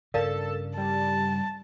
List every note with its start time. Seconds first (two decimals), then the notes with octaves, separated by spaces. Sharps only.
0.14 G2 C#3 A4 A#4 D5 F5 A5
0.77 G3 A5